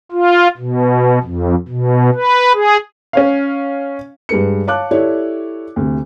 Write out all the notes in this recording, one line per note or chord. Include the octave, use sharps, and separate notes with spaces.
F4
B2
F2
B2
B4
G#4
C#4 C#5 F5
G2 G#3 B4 C#7
C#5 F5 A5 D6 F#6
E4 G4 A4 C#5 D5
D2 C3